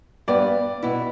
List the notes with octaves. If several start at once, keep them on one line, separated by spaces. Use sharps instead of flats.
G2 G3 B3 D5
B2 B3 E4